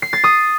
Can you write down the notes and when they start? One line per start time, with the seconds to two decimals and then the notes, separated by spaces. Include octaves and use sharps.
0.02 C7
0.13 A6
0.24 D#6